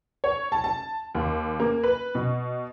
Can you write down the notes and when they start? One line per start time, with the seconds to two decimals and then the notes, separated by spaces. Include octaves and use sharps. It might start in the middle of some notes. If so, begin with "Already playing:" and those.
0.24 C#5
0.52 A5
0.64 A5
1.15 D#2
1.60 A#3
1.84 B4
2.15 B2